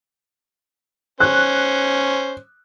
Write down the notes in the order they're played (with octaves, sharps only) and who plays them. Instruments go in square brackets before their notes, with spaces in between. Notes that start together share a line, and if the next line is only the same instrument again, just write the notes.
[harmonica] C#4 C5 [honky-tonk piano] F#6